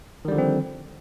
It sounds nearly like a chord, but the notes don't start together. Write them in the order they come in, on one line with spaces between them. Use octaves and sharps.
D#3 G3 D3 F3 C4